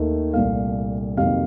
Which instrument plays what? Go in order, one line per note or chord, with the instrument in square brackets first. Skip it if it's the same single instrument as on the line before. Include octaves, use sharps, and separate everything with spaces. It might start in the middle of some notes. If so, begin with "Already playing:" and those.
Already playing: [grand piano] D#2 D#3 A3
C2 A#2 A3 F5
F2 C3 D#3 F#3 A#3 F5